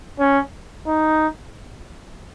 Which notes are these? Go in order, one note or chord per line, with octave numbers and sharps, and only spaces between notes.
C#4
D#4